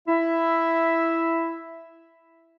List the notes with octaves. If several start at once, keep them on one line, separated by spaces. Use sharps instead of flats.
E4 E5